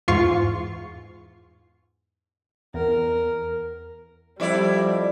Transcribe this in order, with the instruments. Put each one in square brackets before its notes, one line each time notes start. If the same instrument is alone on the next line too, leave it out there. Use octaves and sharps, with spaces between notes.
[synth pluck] E2 G#2 F4 C#6 C7
[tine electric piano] E2 [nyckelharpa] A#4
[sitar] F2 E4 D5 [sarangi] G3